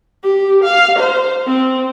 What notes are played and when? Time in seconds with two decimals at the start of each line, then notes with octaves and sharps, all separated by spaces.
0.23 G4
0.64 F5
0.99 C5
1.47 C4